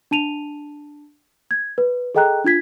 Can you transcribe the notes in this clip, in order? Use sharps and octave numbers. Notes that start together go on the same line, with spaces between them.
D4 A5 D#7 F7
G#6
B4
G#4 A4 D#5 G5 A#5 F#6
D4 F4 G#6 B6